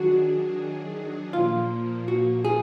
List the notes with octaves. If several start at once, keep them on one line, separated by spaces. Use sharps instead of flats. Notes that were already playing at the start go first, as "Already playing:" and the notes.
Already playing: D#3 F#3 D4 F#4 G#4
A#2 F3 A#3 F4
F#4
G#4